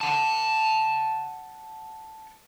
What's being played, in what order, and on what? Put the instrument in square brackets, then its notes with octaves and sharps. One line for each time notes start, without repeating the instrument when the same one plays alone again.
[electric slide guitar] F#5 A5